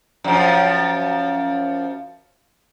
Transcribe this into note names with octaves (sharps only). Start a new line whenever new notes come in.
F#2 F3